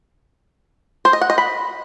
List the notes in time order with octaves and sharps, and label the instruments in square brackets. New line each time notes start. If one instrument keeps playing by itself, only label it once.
[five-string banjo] C5
D#5
F#5
D#5
B5